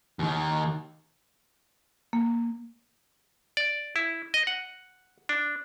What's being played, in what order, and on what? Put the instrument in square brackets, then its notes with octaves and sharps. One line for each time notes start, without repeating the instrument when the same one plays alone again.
[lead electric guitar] D#2 D#3
[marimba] A#3
[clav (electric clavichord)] D5
E4
D#5
F#5
D4